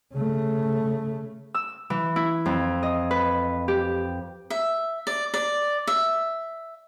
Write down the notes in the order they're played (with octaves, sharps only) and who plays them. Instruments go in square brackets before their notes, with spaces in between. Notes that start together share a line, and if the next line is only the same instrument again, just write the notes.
[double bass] C#3 A3
[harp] E6
E3
E4
F2
D#5
B4
G4
[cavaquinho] E5
D5
D5
E5